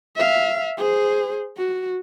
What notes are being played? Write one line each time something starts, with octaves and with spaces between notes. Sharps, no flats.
E5 F5
G#4 C5
F#4